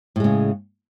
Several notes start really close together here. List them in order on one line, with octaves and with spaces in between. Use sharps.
A2 G#3 C#3